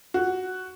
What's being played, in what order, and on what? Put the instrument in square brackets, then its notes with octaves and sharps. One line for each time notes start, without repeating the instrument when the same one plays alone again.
[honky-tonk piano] F#4